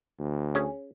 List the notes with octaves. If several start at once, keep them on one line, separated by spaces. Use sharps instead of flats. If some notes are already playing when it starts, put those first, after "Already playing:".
D2
C#4 G#4